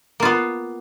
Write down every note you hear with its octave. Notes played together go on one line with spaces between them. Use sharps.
A#3 B3 F4